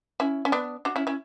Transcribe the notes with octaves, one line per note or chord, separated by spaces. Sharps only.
C#4 E4
C#4
B3 D4
D4 F#4
C#4 E4
C#4 E4